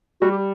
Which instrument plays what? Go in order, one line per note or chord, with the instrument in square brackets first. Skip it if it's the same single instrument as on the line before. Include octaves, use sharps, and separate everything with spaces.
[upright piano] G3 [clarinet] F#4
[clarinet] G4